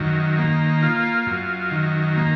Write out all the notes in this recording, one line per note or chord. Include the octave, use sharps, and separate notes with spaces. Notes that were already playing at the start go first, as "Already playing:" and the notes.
Already playing: F#2 D#3
A#3
F4
F#2
D#3
A#3